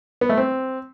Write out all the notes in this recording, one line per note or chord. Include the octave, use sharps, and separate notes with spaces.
B3
A3
C4